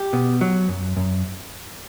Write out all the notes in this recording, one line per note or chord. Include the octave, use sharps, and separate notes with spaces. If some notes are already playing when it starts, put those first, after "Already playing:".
Already playing: G4
B2
F#3
F#2
F#2